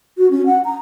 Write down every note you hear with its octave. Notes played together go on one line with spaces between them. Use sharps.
F#4
C#4
F#5
A#5